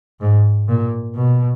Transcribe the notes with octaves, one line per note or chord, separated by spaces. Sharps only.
G#2
A#2
B2